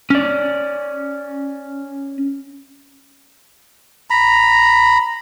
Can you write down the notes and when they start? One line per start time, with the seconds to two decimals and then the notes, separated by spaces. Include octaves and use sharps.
0.10 C#4 D5
4.10 A#5 B5